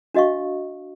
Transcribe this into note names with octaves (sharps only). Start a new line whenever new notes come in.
D4 F#4 D#5 F5 C#6